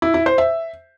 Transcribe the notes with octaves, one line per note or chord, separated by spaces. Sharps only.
E4
E4
C5
E5